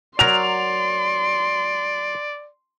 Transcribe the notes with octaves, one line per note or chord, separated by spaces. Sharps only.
F#3 A#4 D5 C6 F7